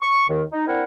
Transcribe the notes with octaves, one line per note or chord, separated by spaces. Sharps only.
C#6
D#2 D#3
D#4
C4 D4 E4 A#4 F#5